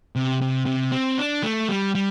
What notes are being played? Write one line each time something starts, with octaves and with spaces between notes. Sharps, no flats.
C3
C3
C3
C4
D4
A3
G3
G3